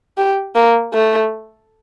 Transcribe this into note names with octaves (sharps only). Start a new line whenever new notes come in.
G4
A#3
A3